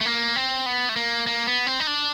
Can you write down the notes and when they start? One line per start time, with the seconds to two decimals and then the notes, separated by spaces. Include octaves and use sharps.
0.01 A3
0.05 A#3
0.36 C4
0.66 B3
0.89 A3
0.96 A#3
1.27 A#3
1.47 B3
1.67 C4
1.80 D#4
1.87 D4